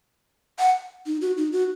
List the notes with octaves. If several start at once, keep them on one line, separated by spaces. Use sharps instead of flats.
F#5
D#4
F#4
D#4
F#4